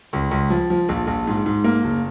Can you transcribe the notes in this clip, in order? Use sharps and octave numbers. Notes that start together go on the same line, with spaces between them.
C#2
C#2
F3
F3
A#1
A#1
G#2
G#2
A#3
F#1